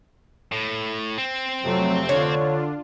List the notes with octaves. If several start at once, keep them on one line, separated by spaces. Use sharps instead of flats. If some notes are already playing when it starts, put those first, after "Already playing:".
A2
C4
F2 C3 F#3 A3
D3 D4 F4 C#5